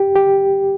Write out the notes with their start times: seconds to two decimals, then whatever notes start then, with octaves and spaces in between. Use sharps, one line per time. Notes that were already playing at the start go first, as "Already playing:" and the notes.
Already playing: G4
0.15 G4